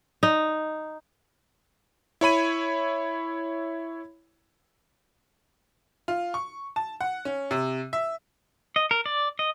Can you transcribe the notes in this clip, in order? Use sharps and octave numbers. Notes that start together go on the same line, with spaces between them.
D#4
E4 C#5 B5 D#7
F4
C#6
A5
F#5
C#4
C3
E5
D#5
A#4
D5
D#5